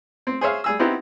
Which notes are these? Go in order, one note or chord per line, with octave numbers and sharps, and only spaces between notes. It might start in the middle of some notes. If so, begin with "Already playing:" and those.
C4
G#4 C5 C#5 E5 F5
G3 G#4 E6
B3 C4 D#4 E4 F#4 G4